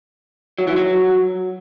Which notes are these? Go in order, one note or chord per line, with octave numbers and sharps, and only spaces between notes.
F#3
E3
F#3